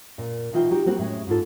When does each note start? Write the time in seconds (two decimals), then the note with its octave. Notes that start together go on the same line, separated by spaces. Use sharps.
0.18 A#2
0.53 B2 E3 D#4 F4 B4 G5
0.71 D#4 F#4 G4
0.86 G3 A#3 C4 F#4
0.99 A2 G#3 C#4
1.27 G#2 D#4 F4 A4